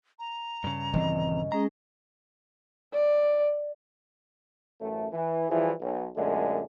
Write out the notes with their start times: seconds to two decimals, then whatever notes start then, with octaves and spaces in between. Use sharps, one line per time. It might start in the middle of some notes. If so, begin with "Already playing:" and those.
0.19 A#5
0.64 G2 C#3
0.93 D#1 E3 C4 D#5
1.52 G#3 C#4 G#4 D#5 A#5
2.93 D5
4.81 A1 F#2 A3
5.12 E3
5.49 E3 F3 G3 E4 G#4
5.81 B1
6.15 F#2 A#2 D3 G#3 A3